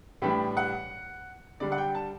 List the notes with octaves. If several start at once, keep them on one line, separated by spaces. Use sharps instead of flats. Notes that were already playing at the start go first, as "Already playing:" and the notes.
A2 E3 G3 D4 G4
F#5
D3 G3 D4 D5
F#5
G5
A5